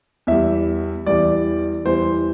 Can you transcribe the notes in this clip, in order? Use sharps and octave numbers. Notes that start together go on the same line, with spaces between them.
E2 E3 G3 E5
E2 E3 G3 D5
E2 E3 G3 C5